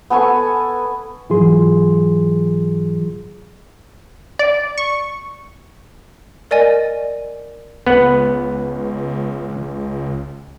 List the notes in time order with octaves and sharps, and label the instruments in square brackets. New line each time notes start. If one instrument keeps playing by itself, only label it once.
[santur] B3 A4 G#5 C#6
[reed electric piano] G#2 E3 F#3 F4 G#4 C6
[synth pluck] D5
C#6
[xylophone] A#4 D5 D#5 G#5 A6
[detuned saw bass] C#2 [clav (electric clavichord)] B3 F#5